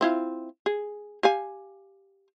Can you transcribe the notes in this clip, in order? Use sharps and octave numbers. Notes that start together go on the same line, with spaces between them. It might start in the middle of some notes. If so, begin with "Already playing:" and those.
C4 E4 F4
G#4
G4 F5 G#5